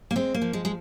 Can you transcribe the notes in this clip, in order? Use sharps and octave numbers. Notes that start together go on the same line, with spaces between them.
A#3
G#3 C4
A#3
F3
G#3
G#3